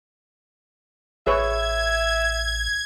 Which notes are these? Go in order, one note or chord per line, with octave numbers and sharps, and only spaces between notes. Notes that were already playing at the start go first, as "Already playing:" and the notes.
A1 G#4 B4 C#5 E5 G#6